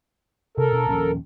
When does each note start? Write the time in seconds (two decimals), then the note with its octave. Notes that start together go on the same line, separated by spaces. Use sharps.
0.57 C3 A4 A#4
0.72 B2 D4
0.89 A#1 D#2 C#4